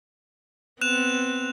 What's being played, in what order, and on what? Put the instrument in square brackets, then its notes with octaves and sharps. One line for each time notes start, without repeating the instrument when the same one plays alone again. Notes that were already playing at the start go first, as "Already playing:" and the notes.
[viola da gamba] B3 C4 [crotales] F#6 E7 F7